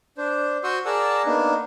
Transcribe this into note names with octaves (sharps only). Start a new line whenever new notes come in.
D4 C5
F#4 C5 C6 C#6 D#6 E6
G#4 A#4 D5 F#5 A5 E6
A#3 B3 D4 D#4